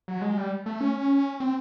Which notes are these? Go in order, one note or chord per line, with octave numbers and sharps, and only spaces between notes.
F#3
G#3
G3
A3
C#4
C4